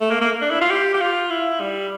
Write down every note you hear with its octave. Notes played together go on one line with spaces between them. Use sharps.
A3
A#3
A#3
D4
E4
F4
G4
G4
F4
E4
G3